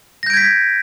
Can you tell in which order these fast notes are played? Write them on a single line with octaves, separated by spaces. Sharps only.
A#6 G6 D7 G#6 B6